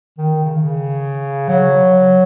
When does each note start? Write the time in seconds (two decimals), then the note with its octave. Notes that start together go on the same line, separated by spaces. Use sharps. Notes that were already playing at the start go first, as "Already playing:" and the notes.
0.18 D#3
0.44 C#3
0.53 D#3
0.62 C#3
1.49 F#3